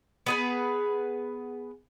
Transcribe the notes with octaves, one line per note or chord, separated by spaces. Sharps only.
B3 G#4 B4